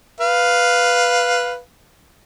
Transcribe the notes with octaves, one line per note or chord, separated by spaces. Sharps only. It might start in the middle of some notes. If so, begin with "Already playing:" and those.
B4 F5